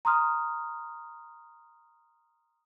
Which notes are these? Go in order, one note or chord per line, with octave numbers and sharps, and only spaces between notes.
A#5 C6 D#6 F6